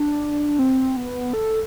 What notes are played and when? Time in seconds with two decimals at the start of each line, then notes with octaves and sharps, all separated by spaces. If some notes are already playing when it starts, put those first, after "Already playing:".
Already playing: D4
0.59 C4
0.96 B3
1.33 A4